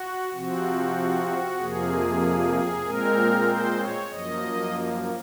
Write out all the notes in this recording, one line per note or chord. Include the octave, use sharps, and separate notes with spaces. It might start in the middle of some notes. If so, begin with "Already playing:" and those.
Already playing: F#4
C3 F3 C4 F#4
F2 C3 F3 A#3 G#4
A#2 G#3 C4 A#4
C5
C#5
F#2 F3 A#3 D#5